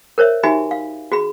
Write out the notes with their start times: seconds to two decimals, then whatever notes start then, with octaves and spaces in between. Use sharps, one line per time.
0.18 A#4 C5 C#5 E5
0.43 D#4 F#4 G4 E5 G#5 B5
0.71 F5
1.12 F#4 G#4 B5